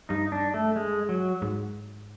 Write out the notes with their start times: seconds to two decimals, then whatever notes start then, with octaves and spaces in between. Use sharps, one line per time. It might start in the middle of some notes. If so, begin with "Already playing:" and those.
0.09 G2 D#4
0.32 D4
0.54 A3
0.76 G#3
1.09 F#3
1.42 G#2